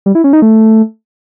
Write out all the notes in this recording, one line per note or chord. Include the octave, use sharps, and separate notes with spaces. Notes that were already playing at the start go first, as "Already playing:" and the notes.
G3
E4
C#4
D#4
A3